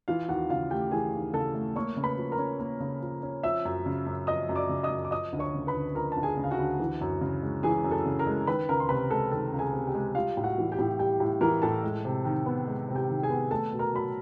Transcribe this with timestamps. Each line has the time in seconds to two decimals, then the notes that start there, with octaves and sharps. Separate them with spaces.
0.08 E3 F4 F5
0.29 D#2 F#4 F#5
0.49 C#3 F4 F5
0.71 A3 G4 G5
0.91 E3 G#4 G#5
1.13 D#2
1.33 C#3 A4 A5
1.55 A3
1.76 A#3 C#5 C#6
1.96 C#3
2.03 B4 B5
2.18 F3
2.32 A#4 A#5
2.39 C#4
2.60 A#3
2.80 C#3
3.02 F3
3.23 C#4
3.43 F3 E5 E6
3.65 F#2
3.86 C#3
4.06 F#2
4.27 F3 D#5 D#6
4.49 F#2
4.56 D5 D6
4.69 C#3
4.83 D#5 D#6
4.90 F#2
5.05 D6
5.11 F3 D#5 D#6
5.33 D2
5.39 C#5 C#6
5.54 C#3
5.67 B4 B5
5.75 D2
5.95 F3 A#4 A#5
6.12 A5
6.17 D2
6.23 G#4 G#5
6.37 C#3
6.44 F5
6.51 F#4 F#5
6.58 D2
6.80 E3
7.01 F#2
7.21 C#3
7.42 G#3
7.63 E3 G#4 G#5
7.84 F#2
7.91 A4 A5
8.06 C#3
8.19 A#4 A#5
8.27 G#3
8.47 D#3 B4 B5
8.69 C#2 A#4 A#5
8.80 C6
8.89 C3 B4 B5
9.10 G#3 A4 A5
9.32 D#3 A4 A5
9.52 C#2
9.59 G#4 G#5
9.73 C3
9.87 G4 G5
9.95 G#3
10.15 G3 F4 F5
10.37 A2
10.44 F#4 F#5
10.58 E3
10.72 G4 G5
10.79 A2
10.99 G3 G4 G5
11.20 A2
11.41 E3 A#4 A#5
11.62 A2 A4 A5
11.83 G#3
12.05 C3
12.25 D#3
12.46 B3
12.67 G#3
12.88 C3
12.95 G4 G5
13.10 D#3
13.23 G#4 G#5
13.30 B3
13.51 A3 A4 A5
13.73 B2
13.79 A#4 A#5
13.93 F#3 B5